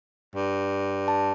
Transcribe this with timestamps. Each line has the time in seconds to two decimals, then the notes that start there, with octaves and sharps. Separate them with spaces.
0.35 G2
1.08 A5